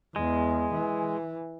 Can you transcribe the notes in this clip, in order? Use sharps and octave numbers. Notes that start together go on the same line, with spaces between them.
E2 G#3
E3